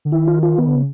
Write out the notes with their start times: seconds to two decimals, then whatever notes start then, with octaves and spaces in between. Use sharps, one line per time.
0.05 D3
0.12 D#3 E4
0.27 F4
0.43 F4
0.58 D#3 B3
0.67 D3
0.75 C#3